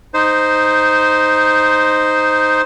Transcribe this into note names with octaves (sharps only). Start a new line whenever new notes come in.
D#4 C5